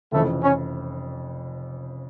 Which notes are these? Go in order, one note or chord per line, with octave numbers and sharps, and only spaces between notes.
F1 F2 C#3 E3 A3
C#4